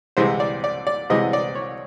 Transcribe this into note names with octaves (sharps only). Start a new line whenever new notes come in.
C2 C3 E3 G#3 C5
D5
D5
D5
C2 C3 E3 G#3 D#5
D5
C#5